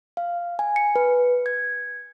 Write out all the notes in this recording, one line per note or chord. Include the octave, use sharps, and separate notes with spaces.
F5
G#5
C#7
B4
G#6